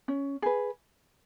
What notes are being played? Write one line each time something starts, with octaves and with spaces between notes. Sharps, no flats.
C#4
G#4 B4